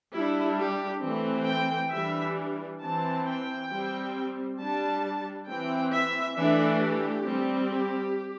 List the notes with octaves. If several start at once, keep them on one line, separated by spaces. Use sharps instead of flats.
G3 D4 E4
G4
E3 A3 C4
G5
E3 G3 D4 E5
E3 C4 A5
G5
G3 C4
G3 D4 A5
E3 C4 G5
E5
E3 A3 D4 E5
G4
G3 C4
G4